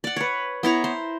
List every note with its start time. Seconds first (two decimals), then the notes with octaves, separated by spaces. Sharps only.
0.04 D5 F#5
0.16 B4 C#5
0.63 B3 E4 C#5 A#5
0.84 C5